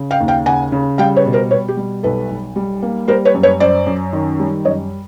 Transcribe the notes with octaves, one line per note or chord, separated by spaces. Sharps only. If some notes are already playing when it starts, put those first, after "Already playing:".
Already playing: C#3
F5 G5
D#2
F5 G5
C#3 F#5 G#5
C#3
G3 F5 G5
B4 C#5
B2
A#4 C5
B2 B4 C#5
G4
G3
B1 A4 B4
B1
G3
A#3
G3 A#4 C5
B4 C#5
F#2
B4 C#5
F#2 C5 D5
F#2
D#3
G3
F#2 C#5 D#5